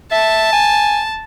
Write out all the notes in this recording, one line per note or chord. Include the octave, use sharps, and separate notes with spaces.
E5 A5
G#5